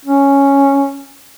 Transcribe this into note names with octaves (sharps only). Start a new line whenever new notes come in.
C#4